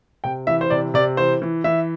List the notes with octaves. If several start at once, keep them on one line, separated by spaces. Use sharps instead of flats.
C3 G5
E3 E5
C5
C3 D5
C3 D5
E3 C5
E3
E3 E5